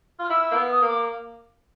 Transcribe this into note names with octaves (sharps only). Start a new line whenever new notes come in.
F4
F6
E4 E6
A#3 E6
B3
D#6
A#3
D6